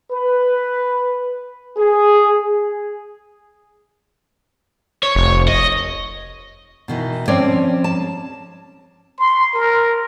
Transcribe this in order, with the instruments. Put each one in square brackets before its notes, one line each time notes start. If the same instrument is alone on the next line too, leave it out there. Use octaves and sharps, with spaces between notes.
[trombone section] B4
G#4
[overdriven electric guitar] C#5
[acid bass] F1
[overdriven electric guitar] D#5
[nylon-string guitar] B2 D#3 E3
F3 C4 C#4 C#5 D5
A5
[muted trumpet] C6
A#4